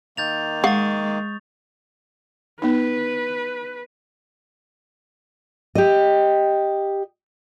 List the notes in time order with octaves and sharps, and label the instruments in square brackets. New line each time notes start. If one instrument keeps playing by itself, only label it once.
[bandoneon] D#3 A#3 [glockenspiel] G6 A6 F7
[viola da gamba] G#3 [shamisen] F5 F#5 [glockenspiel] C#6 D#6 A6
[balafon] B3 D#4 [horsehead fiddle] B4
[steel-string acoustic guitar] G4 D#5